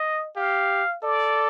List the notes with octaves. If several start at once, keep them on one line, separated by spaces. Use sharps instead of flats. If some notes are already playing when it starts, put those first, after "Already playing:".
Already playing: D#5
G4 F5
A4 D5